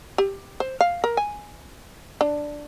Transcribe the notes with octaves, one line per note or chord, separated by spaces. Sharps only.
G4
C5
F5
A#4
G#5
D4